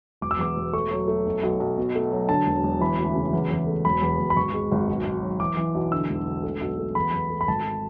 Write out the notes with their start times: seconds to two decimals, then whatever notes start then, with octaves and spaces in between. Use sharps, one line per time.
0.21 E1 D6
0.31 E6
0.39 E2 D6
0.56 E1
0.73 A3 C#6
0.91 F#3
1.08 A3
1.26 B1
1.43 B1
1.60 B1
1.78 B2
1.95 A3
2.12 F#3
2.29 D3 A5
2.46 E1
2.63 E1
2.81 E3 B5
2.98 D2
3.15 C#3
3.33 E2
3.51 E2
3.67 A3
3.85 E1 B5
4.02 E2
4.19 E1
4.30 B5
4.36 G#1 C#6
4.54 G#3
4.72 G#1
4.88 B1
5.05 B1
5.22 F#3
5.40 E3 D6
5.57 E3
5.75 B1
5.92 D3 E6
6.09 E1
6.27 D3
6.43 A3
6.61 B1
6.79 A3
6.95 E2 B5
7.14 E2
7.30 A3
7.41 B5
7.48 G#1 A5